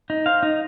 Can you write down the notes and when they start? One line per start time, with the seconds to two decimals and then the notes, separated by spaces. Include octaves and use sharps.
0.10 D#4
0.26 C5 F5
0.43 D#4